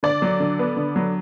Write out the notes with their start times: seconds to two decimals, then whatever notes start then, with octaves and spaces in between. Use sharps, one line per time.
0.03 D3 D5
0.22 F#3
0.40 D3
0.59 B3
0.77 D3
0.96 F#3